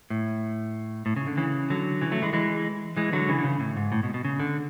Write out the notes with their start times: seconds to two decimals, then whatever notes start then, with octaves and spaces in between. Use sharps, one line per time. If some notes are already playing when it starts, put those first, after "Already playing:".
0.10 A2
1.06 A2
1.16 C#3
1.27 D3
1.37 C#3 E3
1.70 D3 F#3
2.01 C#3 E3
2.11 F#3 A3
2.22 E3 G#3
2.33 E3 G#3
2.97 E3 G#3
3.13 D3 F#3
3.29 C#3 E3
3.38 D3
3.44 C#3
3.60 A2
3.77 G#2
3.92 A2
4.03 B2
4.14 B2
4.25 C#3
4.39 D3